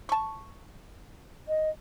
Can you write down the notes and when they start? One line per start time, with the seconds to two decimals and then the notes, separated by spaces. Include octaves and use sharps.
0.09 A5 C#6
1.48 D#5